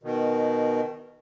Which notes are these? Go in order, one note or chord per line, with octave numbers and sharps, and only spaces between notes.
B2 D#3